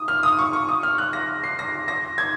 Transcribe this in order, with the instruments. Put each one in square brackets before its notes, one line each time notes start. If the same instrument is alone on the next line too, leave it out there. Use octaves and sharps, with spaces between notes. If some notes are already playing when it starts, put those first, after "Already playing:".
Already playing: [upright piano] D#6
F6
D#6
C#6
C#6
D#6
F6
F#6
A#6
C7
A#6
A#6
G#6